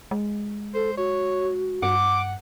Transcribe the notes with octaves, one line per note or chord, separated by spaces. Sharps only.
G#3
A4 C5
F#4 C#5
G2 F#5 D6